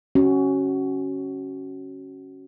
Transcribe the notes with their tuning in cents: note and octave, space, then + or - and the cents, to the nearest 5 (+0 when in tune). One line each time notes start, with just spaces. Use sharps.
C#4 -10 F#4 +20